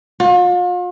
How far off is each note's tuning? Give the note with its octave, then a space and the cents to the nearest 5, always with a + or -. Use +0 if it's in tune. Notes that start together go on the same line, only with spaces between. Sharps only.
F4 +40